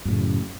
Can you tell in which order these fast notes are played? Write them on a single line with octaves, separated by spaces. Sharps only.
F#2 A2 C#3